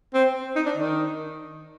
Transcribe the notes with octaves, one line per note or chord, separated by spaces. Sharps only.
C4
D#4
D4
D#3